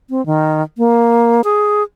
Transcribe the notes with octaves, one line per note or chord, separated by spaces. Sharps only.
C4
D#3
A#3
G#4